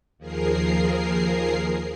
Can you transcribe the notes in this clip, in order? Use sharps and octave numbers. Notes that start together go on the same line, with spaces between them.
D#2 F3 G#4 A#4 C7